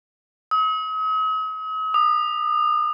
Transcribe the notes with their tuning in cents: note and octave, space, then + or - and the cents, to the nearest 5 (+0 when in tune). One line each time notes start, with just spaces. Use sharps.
D#6 +45
D#6 -40